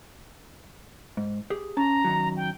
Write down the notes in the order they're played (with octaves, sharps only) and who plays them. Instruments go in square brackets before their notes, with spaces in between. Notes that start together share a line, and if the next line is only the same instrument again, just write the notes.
[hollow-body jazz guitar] G#2
G4 G#4
[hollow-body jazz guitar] C#4 A5 [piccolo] A#5
[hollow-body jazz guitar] F#2 D#3 F#3
[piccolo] G5